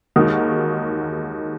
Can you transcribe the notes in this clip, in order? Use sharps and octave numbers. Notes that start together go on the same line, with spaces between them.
D#2 D#3 G#3 F#4 A#4